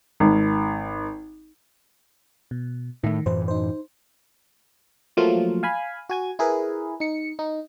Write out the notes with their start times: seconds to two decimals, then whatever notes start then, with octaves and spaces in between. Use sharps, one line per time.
0.20 G#1
2.51 B2
3.04 A2 D#3 A3
3.26 F#2 A2 E3 C5
3.48 D#4 C5
5.17 F3 F#3 A3 A#3 F4
5.63 F5 G#5 B5
6.09 F#4 G#5 G#6
6.39 E4 G#4 A#4 B4
7.00 D#4 C#7
7.39 D#4